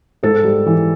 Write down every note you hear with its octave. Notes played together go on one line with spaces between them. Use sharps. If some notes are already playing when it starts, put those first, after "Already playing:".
G#2 A4
G3
E3